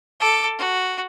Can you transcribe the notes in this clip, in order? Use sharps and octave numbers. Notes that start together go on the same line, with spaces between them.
A4 D6
F#4